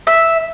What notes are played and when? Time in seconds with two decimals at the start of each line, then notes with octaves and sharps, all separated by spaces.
0.07 E5